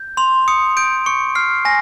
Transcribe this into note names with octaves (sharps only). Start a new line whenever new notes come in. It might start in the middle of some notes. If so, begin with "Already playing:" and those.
Already playing: G6
C6 F7
D#6 C#7
G6 D7
C#6 C#7
F6 C7
G#5 A#6